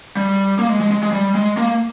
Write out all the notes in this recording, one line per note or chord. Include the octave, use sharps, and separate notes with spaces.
G3
A#3
G#3
G#3
G#3
G#3
G3
G#3
A#3